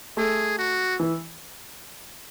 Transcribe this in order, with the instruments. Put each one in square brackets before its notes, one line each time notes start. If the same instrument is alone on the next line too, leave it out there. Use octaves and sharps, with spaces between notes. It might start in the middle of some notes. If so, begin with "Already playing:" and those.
[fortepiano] A3 [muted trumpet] G#4
[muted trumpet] F#4
[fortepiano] E3